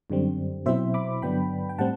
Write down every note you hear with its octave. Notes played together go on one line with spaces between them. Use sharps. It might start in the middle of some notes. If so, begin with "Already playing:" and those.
F#2 D3 G3 C4
B2 F#3 C4 E4 C5 E5
B5 D6
G2 D3 F#3 B3 D4 G5 B5
G5
A2 G3 C4 F#5 A5